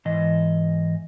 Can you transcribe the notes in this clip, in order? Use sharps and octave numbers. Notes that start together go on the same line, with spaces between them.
G#2 E3 D#5